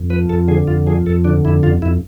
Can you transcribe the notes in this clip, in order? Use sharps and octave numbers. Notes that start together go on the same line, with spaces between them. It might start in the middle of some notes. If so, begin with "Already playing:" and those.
Already playing: F2
F3 B4
F2 A4
D3 G#4
F2 F4
F3 G#4
F2 A4
D3 D4
F2 E4
F2 F4
F2 E4